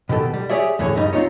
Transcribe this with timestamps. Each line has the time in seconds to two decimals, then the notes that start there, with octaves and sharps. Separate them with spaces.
0.09 B2 D#3 G4 A4
0.34 G3
0.50 G4 G#4 C#5 D5 E5
0.79 E2 A2 D3 G#4 C#5
0.95 C#2 G2 G3 D#4 D#5
1.13 C4 D#4 F4 C#5